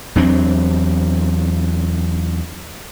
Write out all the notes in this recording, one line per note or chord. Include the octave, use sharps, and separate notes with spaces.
E2 F#3 C4 D4